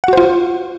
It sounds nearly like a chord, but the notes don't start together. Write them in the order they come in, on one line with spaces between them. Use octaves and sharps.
F#5 F#4 C5 F4